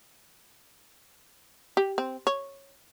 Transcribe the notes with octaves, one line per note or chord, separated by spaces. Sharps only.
G4
C4
C#5